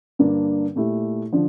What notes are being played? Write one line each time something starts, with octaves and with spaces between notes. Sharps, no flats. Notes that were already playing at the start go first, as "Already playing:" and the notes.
G2 D3 G3 A#3 D4
A#2 A3 E4 G4
D3 F3 D4